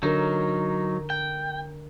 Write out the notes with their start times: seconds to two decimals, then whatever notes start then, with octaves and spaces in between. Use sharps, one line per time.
0.03 D3 F#3 D#4 A#4
1.10 G5